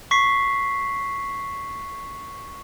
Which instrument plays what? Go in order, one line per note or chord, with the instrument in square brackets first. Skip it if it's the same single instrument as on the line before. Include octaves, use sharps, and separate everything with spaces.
[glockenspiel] C#6 B6 C7